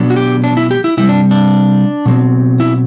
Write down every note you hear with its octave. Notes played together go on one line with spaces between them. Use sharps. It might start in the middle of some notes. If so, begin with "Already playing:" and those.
Already playing: B2 F#3 B3 D4
F#4
G4
D4
E4
G4
E4
C3 G3 C4 E4
D4
D4
B2 F#3 C4
E4